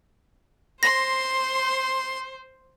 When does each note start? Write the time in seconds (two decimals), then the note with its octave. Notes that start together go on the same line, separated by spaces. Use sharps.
0.83 C5 C6 A#6